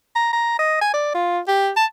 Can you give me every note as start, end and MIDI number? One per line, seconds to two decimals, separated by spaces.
0.16 0.31 82
0.33 0.56 82
0.59 0.77 75
0.81 0.91 80
0.93 1.12 74
1.15 1.40 65
1.48 1.70 67
1.76 1.85 81